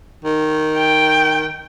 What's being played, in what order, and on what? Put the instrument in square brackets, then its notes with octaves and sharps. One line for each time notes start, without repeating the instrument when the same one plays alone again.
[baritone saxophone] D#3
[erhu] G5